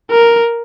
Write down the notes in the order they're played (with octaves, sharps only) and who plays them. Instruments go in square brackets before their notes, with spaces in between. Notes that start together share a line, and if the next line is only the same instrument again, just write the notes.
[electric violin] A#4